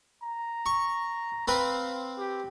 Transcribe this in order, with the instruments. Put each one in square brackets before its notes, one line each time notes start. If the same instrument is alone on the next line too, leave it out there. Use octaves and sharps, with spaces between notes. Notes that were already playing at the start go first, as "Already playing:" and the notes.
[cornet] A#5
[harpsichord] C#6
[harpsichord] C4 B4 [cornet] F5
[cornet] G4